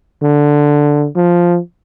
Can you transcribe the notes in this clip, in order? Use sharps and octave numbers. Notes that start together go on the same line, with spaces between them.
D3
F3